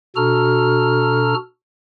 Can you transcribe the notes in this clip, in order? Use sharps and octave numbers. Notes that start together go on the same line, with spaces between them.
B2 D4 F#4 A4 A#5 F6